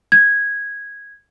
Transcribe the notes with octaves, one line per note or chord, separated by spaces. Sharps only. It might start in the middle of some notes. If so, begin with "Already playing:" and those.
G#6